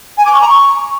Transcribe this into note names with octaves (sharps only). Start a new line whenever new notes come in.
G#5
D6
C#6
A#5
C#6